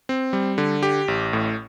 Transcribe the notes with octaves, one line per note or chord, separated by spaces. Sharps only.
C4
G3
D3
G4
A1
A2